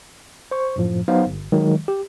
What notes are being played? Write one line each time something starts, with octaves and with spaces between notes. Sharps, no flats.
C5 C#6
F#2 A2 F3
F#3 B3 D#4 C5 F5
G1
D#3 F#3 G#3
G4